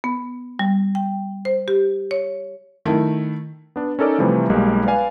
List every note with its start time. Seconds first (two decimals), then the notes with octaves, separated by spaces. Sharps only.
0.04 B3
0.59 G3
0.95 G5
1.45 C5
1.68 G4
2.11 C#5
2.85 D#3 A3 E4
3.76 B3 D4
3.99 C#4 D#4 A4 A#4 D5
4.18 C3 E3 F3 G3 A3
4.50 B1 G3 G#3 A#3
4.86 B4 D5 F5 G#5